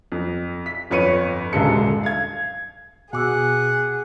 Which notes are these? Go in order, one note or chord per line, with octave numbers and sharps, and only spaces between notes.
F2
B6
G1 F2 B4 C#5 C#7 D#7
D#1 F#2 D3 G#3 A4 C#7
F5 G#6
B2 G#4 F#5 G#5 D6 E6